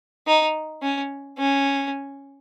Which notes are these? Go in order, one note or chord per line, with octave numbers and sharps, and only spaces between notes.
D#4
C#4
C#4